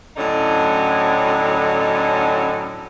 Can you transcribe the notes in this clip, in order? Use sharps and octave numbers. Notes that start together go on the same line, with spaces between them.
A2 D3 F#3 C#4 D#4